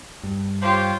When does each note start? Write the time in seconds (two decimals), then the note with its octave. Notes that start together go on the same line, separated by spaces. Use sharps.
0.23 G2
0.62 F4 G4 C5 C#5